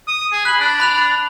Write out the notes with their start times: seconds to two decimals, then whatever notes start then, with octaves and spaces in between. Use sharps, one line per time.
0.08 D#6
0.32 G#4
0.45 B5 F#6 F#7
0.60 D4
0.80 B5 F#6 F7